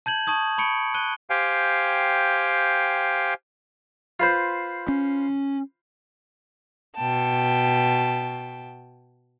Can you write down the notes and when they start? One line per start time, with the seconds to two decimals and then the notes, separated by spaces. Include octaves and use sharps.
0.06 A5 G6 G#6 F#7
0.27 A5 C#6 D#6 G#6
0.58 B5 C#6 C#7 D7
0.94 F#6 D#7 G7
1.30 G4 C5 F5 G5 G#5
4.20 F4 B4 C5
4.88 C#4
6.96 B2 G5 A5